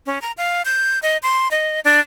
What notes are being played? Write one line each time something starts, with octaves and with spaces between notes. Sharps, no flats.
C#4
A#5
F5
G6
D#5
C6
D#5
D4